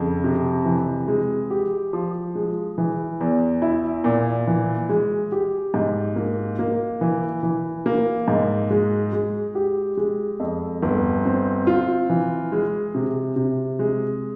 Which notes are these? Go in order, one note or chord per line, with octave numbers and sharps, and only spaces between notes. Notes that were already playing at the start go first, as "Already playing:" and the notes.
Already playing: F2 C#3
C3
E3
G#3
G4
F3
G#3
E3
E2
E4
A#2
E3
G#3
G4
G#2
A#3
A#3
E3
E3
A#3
G#2
G#3
G#3
G4
G#3
F2
G1
C4
F4
E3
G#3
C3
C3
G#3